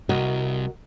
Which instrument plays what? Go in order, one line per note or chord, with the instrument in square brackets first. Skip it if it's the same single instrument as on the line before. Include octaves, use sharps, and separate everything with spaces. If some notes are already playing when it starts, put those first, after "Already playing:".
[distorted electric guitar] C2 [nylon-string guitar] F#4 A#4 D#5